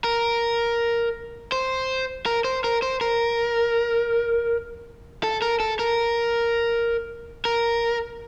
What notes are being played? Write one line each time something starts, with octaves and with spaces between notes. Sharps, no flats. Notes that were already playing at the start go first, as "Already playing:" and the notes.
A#4
C5
A#4
C5
A#4
C5
A#4
A4
A#4
A4
A#4
A#4